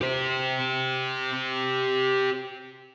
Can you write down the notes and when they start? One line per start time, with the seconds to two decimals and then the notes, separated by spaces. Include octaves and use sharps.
0.01 G4 C5